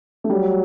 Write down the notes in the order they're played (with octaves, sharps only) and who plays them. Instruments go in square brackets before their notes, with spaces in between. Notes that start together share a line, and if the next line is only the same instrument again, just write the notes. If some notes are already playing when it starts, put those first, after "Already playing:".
[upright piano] A3
[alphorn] F#3 [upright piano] G3